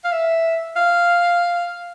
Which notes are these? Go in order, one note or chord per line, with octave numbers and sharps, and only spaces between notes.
F5
E5
F5